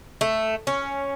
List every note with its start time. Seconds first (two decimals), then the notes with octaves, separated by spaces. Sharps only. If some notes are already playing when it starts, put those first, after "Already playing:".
0.21 A3
0.67 C#4